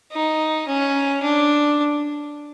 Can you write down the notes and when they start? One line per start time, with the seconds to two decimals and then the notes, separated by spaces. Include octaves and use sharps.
0.13 D#4
0.68 C#4
1.23 D4